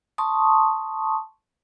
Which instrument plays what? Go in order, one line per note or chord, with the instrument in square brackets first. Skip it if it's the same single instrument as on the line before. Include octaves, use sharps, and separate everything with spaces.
[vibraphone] A5 C6 C#6 D#6